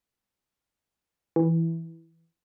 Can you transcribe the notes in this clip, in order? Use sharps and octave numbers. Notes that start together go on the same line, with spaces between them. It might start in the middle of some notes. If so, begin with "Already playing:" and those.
E3